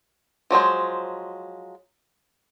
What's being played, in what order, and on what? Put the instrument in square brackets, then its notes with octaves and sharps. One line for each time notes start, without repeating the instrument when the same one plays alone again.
[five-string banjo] F3 F#3 G#3 C5